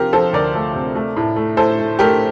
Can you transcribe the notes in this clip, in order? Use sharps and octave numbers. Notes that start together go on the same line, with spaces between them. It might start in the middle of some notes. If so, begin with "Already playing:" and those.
Already playing: C3 F3 F4 G4 A#4
F3 A4 C5
D2 A#4 D5
A3
C3
A3
A2
A3
A2 A4 C5
A3
A3 G4 A#4